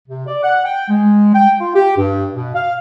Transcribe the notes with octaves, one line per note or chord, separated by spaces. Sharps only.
C3
D5
F#5
G5
G#3
G5
F4
G4
G2
B2
F5